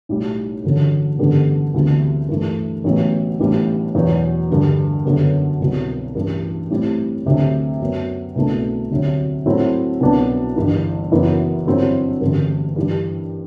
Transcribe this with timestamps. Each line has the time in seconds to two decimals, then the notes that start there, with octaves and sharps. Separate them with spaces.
0.09 B1 A2 G3
0.64 A1 G2 D3 F#3
1.19 A1 G2 D3 G3 B3
1.74 D2 C3 E3 G3 B3
2.29 G2 E3 A3
2.84 A1 A2 F#3 B3
3.40 A1 A2 G3 B3 D4
3.95 E2 B2 F#3
4.50 G2 D3 G3
5.05 F#2 D3 F#3 B3
5.60 C2 B2 F#3
6.15 A1 G2 E3
6.70 A2 G3 C4 E4
7.26 D2 C3 F#3 A3 D4
7.81 F#2 F#3 B3
8.35 C2 B2 A3 D4
8.91 D2 C3 F#3
9.46 A2 F#3 A3 C4 E4
10.00 C2 B2 F#3 B3 D4
10.56 G1 G2 E3
11.11 F#1 F#2 E3 B3 E4
11.66 G1 G2 F#3 C4 E4
12.21 A1 G2 D3
12.76 G2 E3 G3